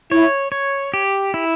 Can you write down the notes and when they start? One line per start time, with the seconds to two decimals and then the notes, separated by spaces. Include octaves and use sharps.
0.11 E4 C#5
0.52 C#5
0.94 G4
1.34 E4